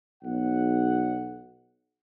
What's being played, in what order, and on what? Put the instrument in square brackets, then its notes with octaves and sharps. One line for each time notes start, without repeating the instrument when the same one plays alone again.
[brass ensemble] B1 F#5